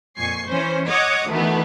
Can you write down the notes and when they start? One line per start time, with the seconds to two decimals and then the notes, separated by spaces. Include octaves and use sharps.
0.17 F2 A#2 G#5 C#6 C7
0.47 E3 C#4 C5
0.87 C#5 D#5 F#5 D6 D#6
1.29 D2 D#3 E3 A3 B3